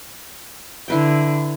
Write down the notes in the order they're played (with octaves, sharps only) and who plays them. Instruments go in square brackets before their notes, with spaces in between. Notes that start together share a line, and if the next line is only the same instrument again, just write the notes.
[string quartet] D3 [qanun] E4 B4 G5